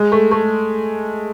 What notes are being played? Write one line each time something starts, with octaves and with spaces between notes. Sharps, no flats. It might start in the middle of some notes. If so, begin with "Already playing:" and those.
Already playing: G#3
A3
A3